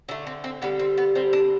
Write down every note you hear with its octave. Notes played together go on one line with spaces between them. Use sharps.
D3 A3 D4
C4
C4
D3 G3 B3
C4
B3
D3 G3 C4
D4